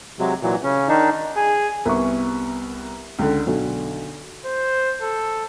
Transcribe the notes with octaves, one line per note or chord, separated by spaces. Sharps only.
C3 F#3 G#3
A#2 E3 F#3
C#3 C#4
D#3 D4 D#4
G#4
C2 B3 A#4 E5 C#6
C#2 D3
B1 D3
C5
A4